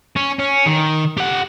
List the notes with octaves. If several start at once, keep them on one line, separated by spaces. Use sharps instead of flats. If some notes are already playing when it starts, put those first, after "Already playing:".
C#4
C#4
D#3
G4 F#5